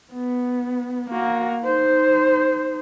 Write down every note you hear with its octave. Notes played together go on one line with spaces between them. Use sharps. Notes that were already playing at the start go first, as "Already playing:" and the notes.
B3
A#3 F#4
D#4 C5